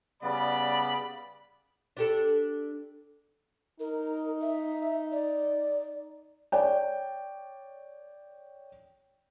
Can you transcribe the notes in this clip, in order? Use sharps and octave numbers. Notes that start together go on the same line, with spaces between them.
C#3 G3 B3 D5 B5
D4 G4 A4
D#4 A#4
E5
D5
C#5 D5 G5